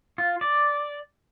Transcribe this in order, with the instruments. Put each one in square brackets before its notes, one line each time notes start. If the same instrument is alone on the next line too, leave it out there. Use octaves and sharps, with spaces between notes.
[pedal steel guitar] F4
D5